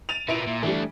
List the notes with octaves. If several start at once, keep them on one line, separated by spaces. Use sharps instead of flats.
A6 D#7 F7
A#2 B3 E4 D7 F7
A#2
E3 G3 A3 D4